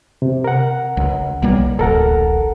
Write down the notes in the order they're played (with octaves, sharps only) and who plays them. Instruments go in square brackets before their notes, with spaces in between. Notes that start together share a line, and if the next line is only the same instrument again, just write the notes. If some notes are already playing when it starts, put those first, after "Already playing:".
[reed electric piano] C3
A#4 F#5
[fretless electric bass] C#2
B1 G3 A#3
[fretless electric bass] D1 A1 [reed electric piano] A4 A#4 F#5